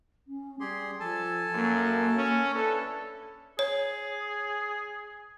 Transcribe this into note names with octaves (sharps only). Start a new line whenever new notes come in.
C#4
G3 G4 G#4 C6
F3 A4 G#5 A5
F#2 A#3
C#4
D4 E4 A4 B4
G#4 C#5